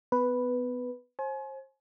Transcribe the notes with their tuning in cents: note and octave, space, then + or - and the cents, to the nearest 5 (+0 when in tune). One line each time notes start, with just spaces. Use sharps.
B3 +25 B4 +0
C5 +35 G#5 +35